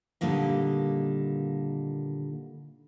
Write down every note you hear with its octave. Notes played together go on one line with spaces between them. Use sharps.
A#2 D3 D#3 G3 A#3 D#5